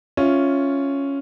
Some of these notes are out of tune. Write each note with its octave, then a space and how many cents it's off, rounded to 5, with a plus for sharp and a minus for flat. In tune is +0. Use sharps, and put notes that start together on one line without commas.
C#4 +0 F4 +0 E5 +0